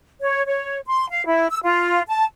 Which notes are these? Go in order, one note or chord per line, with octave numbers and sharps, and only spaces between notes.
C#5
C#5
C6
F5
E4
E6
F4
A5